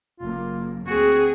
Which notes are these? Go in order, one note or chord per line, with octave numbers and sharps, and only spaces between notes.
F#1 A#3 F4
D2 C4 F#4 G#4